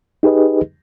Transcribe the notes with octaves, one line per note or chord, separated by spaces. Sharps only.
D#4 G4 G#4 B4 D#5